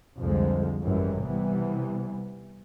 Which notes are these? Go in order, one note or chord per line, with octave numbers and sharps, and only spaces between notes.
C2 F2 D3 F3 G#3
G#1 F#2 E3 G3 G#3
C3 E3 G3 B3